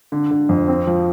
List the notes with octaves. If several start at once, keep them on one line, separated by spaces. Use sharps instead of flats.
D3
D3
F2
C4
F3